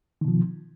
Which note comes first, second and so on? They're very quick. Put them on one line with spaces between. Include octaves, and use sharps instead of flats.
D#3 B2 F3